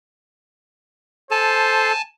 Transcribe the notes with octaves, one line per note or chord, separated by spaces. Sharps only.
A4 C5 G#5 A5